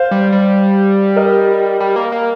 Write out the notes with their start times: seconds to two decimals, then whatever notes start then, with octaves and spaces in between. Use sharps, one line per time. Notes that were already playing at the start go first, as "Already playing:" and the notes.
Already playing: C5 F5
0.11 G3
0.32 G3
1.16 A#4 D#5
1.80 G3
1.96 A#3
2.12 A#3